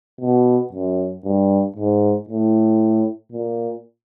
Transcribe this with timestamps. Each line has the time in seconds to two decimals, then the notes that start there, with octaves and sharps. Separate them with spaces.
0.21 B2
0.73 F#2
1.24 G2
1.76 G#2
2.29 A2
3.32 A#2